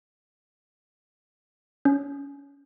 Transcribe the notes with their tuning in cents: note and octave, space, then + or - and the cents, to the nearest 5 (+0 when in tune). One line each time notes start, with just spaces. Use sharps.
C#4 +20